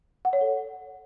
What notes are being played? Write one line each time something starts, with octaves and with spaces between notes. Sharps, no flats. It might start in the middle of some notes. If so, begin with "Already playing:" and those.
F#5
C#5
A4